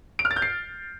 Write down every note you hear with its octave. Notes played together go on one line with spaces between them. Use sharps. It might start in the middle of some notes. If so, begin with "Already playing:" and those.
D7
F6
A6
G6
C7